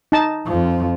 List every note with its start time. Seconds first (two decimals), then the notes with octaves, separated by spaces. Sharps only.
0.12 D#4 A5
0.46 F2 F3